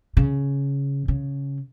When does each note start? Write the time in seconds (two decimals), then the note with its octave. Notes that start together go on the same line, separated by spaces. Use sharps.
0.17 C#3
1.08 C#3